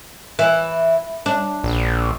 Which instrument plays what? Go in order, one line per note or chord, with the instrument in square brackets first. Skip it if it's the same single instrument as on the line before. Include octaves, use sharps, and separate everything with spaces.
[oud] E3
D4
[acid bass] A#1